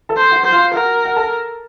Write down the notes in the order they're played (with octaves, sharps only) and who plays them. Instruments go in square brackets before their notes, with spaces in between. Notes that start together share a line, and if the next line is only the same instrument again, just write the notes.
[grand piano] A4 A5
[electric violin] C5
[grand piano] F#4 F#5
[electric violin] C5
[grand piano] F4 F5
[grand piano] F#4 F#5 [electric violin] A#4
[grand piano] F#5
A4 A5